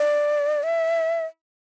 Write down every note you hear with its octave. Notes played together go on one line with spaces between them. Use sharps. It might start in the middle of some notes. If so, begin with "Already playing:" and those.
Already playing: D5
E5